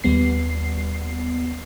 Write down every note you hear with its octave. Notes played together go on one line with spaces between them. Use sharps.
D#2 G3 B3 C7